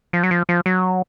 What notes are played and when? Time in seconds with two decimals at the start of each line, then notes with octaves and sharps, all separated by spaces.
0.13 F3
0.23 F#3
0.31 F3
0.49 F3
0.66 F#3